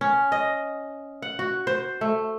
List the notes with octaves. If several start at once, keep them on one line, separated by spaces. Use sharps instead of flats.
C#4
D#5
F#5
F#4
C5
A3